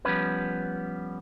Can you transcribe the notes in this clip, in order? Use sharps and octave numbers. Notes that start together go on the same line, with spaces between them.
F3 G3 B3 C#4 B4